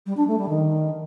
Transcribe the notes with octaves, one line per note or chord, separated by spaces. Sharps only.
G3
D4
A3
G3
D#3